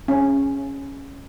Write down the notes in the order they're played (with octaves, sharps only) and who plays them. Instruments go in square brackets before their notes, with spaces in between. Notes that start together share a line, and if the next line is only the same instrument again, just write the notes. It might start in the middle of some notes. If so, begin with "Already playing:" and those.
[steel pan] C#4